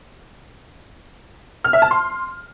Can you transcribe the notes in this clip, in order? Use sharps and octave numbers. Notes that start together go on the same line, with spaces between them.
F6
E5
A5
C6